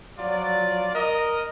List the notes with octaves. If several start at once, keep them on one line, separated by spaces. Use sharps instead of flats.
F3 F#3 F4 D5
A#4 D#5